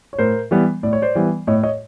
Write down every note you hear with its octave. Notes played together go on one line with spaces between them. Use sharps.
C#5
A2 A#4 C5
E3 G3 B3
A2 D5
C#5
C5 D5
E3 G3 B3
A2 C#5 D#5
C#5 D#5